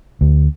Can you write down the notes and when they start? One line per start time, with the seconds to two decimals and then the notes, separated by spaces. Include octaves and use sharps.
0.21 D2